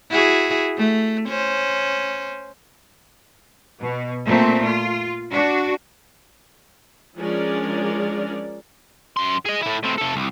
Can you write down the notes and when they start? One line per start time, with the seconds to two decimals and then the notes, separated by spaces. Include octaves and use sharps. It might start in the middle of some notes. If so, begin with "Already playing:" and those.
0.11 E4 F#4 G#4
0.77 A3
1.28 C#4 C5
3.80 B2
4.27 A#2 A3 C4
4.64 F4
5.31 D4 F#4
7.17 F3 G#3 C#4 D4 A#4 D5
9.17 F#2 C6
9.45 G#4 D#5
9.62 A2 E4
9.83 A2 C4
9.98 C3 A4
10.15 C2